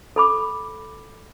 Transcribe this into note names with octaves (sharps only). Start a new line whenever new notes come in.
A4 B5 D6